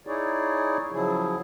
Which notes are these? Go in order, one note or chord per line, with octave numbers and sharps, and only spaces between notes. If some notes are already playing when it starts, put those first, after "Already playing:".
D#4 E4 G#4 C#5 D5
C#3 F3 F#3 E4 G#4